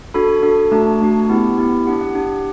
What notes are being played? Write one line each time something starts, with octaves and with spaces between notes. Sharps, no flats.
D4 F#4 A4 B5
D4 F#4 A4
A3 D4 F#4 A5
A3 D4 F#4
B3 E4 G4
B3 E4 G4
D4 G4 F#5
F#5
D4 G4